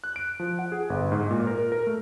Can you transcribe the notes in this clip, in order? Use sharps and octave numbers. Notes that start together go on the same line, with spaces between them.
F#6
D7
F3
F#5
G#4
G1
G#2
A#2
A#4
A#4
A3